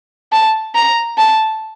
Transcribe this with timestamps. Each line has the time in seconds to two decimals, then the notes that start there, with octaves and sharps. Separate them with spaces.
0.32 A5
0.75 A#5
1.18 A5